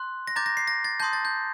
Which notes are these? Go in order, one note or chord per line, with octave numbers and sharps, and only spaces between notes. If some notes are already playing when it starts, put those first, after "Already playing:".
Already playing: C6 F#6
A#6
A#5 D6 G6 A6
A#6
C7
A#6
A6
A5 C6 D#6 G6
A6
G6